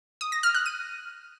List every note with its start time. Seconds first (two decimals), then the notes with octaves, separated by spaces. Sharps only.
0.21 D#6
0.32 A#6
0.43 F6
0.54 F#6
0.66 D#7